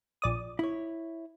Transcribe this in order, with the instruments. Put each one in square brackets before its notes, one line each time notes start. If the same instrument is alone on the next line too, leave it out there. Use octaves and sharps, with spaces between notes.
[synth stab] A#1 D5 D#6
[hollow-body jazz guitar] E4 C#5